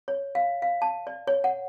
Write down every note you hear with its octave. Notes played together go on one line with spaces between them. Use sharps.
C#5
F5
F5
A5
D5
C#5
F#5